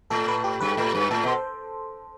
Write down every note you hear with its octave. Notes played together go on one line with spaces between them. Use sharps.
A2 A4
B4
G4
G2 B4
A2
G2
A2 A4
B2
C5